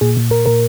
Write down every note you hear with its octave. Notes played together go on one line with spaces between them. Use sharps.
A#2 G#4
A#2
A#2 A#4
A#2 A#4